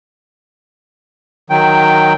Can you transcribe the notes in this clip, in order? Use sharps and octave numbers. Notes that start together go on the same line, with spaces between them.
D#3 F#3 G5